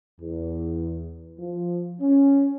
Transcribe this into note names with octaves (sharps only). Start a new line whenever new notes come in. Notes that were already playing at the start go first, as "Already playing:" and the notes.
E2
F3
C#4